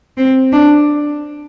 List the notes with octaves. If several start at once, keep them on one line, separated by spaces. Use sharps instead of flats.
C4
D4